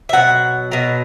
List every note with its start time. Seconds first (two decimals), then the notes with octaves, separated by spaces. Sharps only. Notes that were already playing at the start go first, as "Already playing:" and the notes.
0.09 E5
0.13 B2 F#3 F#5
0.72 B2 F#3